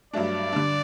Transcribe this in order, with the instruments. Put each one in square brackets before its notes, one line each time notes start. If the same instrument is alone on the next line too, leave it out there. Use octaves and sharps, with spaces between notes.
[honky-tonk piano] G2 F#3 A3 D4 [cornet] D5
[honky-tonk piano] D3 G3 D4